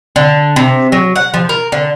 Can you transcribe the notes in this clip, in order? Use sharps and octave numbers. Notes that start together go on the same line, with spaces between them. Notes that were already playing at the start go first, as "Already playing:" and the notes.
D3
C3
F#3
F#5
F3
A#4
D3